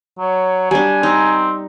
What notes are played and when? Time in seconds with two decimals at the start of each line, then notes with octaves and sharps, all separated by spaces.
0.19 F#3 C#5
0.71 G3 D4 G#5
1.03 C4 D#4